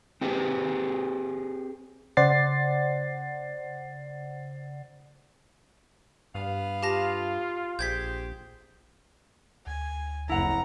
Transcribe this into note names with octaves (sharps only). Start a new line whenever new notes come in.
C4 G4 G#4 B4 C5
C#3 C5 D5 F#5 A6 C7
G2 B3 F5
F4 G4 A5 A#6
A#1 G4 G#4 C5 G6 G#6 B6
D2 G#5
F#1 F2 E4 F#5 A#5